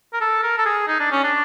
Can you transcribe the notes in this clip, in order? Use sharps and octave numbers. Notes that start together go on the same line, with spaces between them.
A#4
A4
A#4
A4
G#4
D#4
D4
C#4
D4